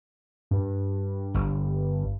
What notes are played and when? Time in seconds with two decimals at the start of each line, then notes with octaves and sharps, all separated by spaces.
0.51 G2
1.34 G1